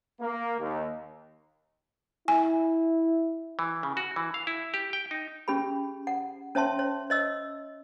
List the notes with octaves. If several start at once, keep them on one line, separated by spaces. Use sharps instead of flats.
A#3
D#2
E4 G#5
E3
C#3
F#4
E3
F5
E4
G4
G5
D#4
C#4 G4 G#4 B5
F#5
C#4 C#5 E5 A5 C6
C#5
C#5 D#5 E6